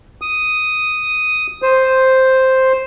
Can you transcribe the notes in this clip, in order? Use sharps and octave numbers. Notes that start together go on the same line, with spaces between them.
D#6
C5